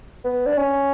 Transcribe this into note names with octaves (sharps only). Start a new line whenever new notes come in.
B3
D4
C#4